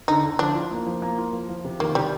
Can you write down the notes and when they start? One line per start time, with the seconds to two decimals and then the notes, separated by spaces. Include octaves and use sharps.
0.08 D3 D#4
0.24 D3
0.39 F3 D4
0.55 F4
0.71 A#3
0.86 F3
1.02 A#3
1.18 F4
1.33 F3
1.49 F3
1.64 C3
1.80 D#3 A#3
1.95 C3 G3